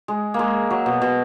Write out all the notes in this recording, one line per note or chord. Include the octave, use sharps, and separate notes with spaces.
G#3
A#3
G#3
F#3
B2
B2